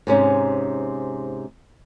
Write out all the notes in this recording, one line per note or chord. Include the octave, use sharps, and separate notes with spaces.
G#2 C3 C#4 D#4